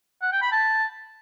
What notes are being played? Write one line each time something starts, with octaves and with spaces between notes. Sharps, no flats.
F#5
G5
B5
A5